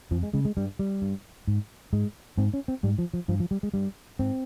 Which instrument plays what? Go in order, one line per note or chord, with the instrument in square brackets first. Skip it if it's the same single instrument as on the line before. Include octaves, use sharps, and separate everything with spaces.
[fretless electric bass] F2 F3
G#3
C#3 G#3
G#3
G2 G3
G3
G2
G#2
G#2 G#3
G#2 C4
C#4
C4
G#2 G3
F3
F3
G2 F3
F3
G3
G#3
G2 G3
G#2 C4